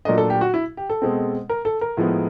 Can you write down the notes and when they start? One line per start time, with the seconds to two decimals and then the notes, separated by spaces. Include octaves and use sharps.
0.05 A#2 F#3 A3 D4 D#5
0.18 A4
0.30 G4
0.41 F#4
0.54 E4
0.77 G4
0.90 A4
1.02 B2 G#3 C4
1.49 A#4
1.65 A4
1.81 A#4
1.97 A2 F3 G#3 B3